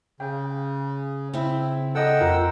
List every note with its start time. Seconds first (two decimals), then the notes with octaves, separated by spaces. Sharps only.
0.20 C#3 G5
1.34 C#3 C4 E4
1.95 A4 D#5 F#5 G5 E6
2.21 F2 F4 A#4